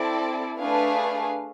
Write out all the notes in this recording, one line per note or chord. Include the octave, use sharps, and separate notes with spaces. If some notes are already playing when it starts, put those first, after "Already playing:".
Already playing: C4 E4 A4 D5
A3 D4 G#4 B4 F5